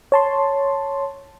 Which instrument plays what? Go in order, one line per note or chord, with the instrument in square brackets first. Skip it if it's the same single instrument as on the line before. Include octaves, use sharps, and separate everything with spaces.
[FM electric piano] C#5 A5 C6